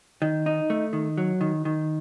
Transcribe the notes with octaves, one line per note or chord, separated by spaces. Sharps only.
D#3
D#4
A3
D#3
F#3
D#3
D#3